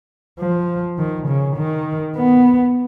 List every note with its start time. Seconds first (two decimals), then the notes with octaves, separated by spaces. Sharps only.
0.40 F3
0.99 D#3
1.28 C#3
1.57 D#3
2.17 B3